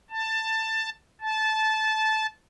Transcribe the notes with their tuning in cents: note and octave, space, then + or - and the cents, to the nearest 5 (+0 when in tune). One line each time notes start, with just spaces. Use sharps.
A5 +15
A5 -15